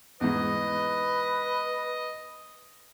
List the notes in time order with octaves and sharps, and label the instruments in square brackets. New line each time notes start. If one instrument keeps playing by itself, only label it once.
[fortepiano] E2 G#2 [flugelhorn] B4 [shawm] D#5